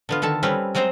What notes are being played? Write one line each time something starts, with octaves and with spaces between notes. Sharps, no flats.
D3 B3 F4
D3 D#3 A4 A5
G3 C4 C#4 B4
F#3 G#3 C4 C5 A#5